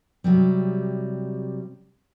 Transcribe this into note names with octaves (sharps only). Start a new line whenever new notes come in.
C3 F#3 G3